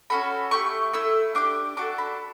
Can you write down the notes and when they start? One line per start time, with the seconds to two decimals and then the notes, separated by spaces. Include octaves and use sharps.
0.10 C#4 F#4 A4 B5
0.51 A3 E4 G4 C#6
0.93 A3 E4 E6
1.35 D4 G4 D6
1.77 D4 F#4 A4 D6
1.98 B5